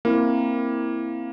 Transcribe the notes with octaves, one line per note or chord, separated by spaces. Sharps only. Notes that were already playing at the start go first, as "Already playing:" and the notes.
A#3 C4 E4 A#4